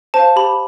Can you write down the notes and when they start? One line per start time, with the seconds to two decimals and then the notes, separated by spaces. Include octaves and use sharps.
0.14 C5 F5 A5
0.36 G4 B5